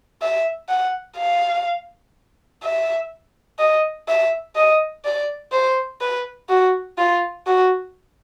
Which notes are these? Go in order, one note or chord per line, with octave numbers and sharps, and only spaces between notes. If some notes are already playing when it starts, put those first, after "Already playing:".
E5
F#5
F5
E5
D#5
E5
D#5
D5
C5
B4
F#4
F4
F#4